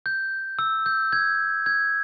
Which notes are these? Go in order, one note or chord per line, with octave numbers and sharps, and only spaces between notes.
G6
E6
G6
G#6
G#6